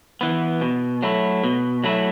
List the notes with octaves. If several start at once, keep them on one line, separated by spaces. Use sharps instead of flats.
E3 B3
B2
F#3 A3 E4
B2
F#3 A3 E4